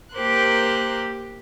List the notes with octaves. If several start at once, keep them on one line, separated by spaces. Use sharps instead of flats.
A#3 G4 A#4 C5 F#6